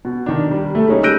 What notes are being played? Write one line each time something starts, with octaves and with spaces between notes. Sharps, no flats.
B2
D#3 D4
G3
A3 A4
G3 G#3 C#4 D#4
E6 F#6 G6 A#6 D7 D#7